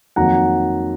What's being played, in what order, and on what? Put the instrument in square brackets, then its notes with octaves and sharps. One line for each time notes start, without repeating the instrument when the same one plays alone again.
[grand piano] F2 D#3 F#3 A#3 F#5 A#5